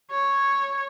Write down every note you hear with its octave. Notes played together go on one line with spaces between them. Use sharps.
C#5